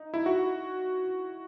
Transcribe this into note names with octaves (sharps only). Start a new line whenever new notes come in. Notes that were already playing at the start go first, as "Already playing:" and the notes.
Already playing: D#4
E4
F#4